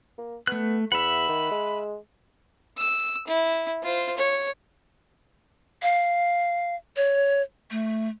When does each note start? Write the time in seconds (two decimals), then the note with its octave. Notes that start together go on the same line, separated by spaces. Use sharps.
0.18 A#3
0.47 A3 B3 F#6
0.92 E2 E5 F#5 B5
1.29 D#3
1.51 G#3
2.78 E6
3.27 E4
3.83 F4 C5
4.16 C#5
5.82 F5
6.96 C#5
7.71 A3